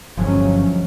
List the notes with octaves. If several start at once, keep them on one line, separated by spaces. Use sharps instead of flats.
G1 C#2 F3 F#3 G#3 A3 C#4